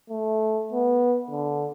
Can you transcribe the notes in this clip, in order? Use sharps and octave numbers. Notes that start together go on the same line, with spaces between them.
A3
B3
D3